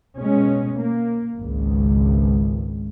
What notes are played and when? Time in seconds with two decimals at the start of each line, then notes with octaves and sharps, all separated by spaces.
0.19 B2 G#3 C#4
0.76 A#3
1.37 G#1 C#2